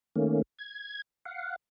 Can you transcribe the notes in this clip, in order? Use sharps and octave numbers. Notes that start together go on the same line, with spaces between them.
D#3 A3 A#3 C#4
G#6
F5 F#5